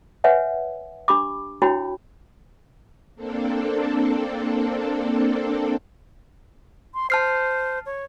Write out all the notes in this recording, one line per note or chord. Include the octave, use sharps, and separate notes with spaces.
B4 C#5 E5 F#5 G#5
D4 G4 B5 D6
D4 E4 F#4 C#5 G5 B5
A#3 C4 D4 A4
C6
C5 A5 F6 C7
C#5